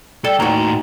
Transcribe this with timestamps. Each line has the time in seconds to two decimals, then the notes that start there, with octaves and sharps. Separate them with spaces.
0.24 G3 A4
0.40 D#2 A2 F#4 A#5